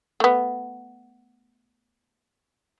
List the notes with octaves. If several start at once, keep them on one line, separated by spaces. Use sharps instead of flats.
A3 B3